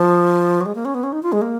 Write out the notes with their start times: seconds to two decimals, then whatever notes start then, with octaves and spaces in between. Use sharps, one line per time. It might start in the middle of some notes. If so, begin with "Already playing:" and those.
Already playing: F3
0.61 F#3
0.66 G#3
0.75 A#3
0.85 C#4
0.94 B3
1.03 C#4
1.12 D#4
1.23 F4
1.32 G#3
1.42 A#3